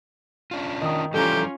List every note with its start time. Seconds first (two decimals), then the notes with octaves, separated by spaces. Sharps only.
0.51 C#4 D4 F4
0.82 D#3 D#5 D#6
1.14 E3 F3 G3 C#4 F4 G4 A4 A#5